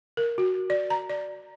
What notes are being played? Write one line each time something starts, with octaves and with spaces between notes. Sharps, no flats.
A#4
F#4
D5
A#5
D5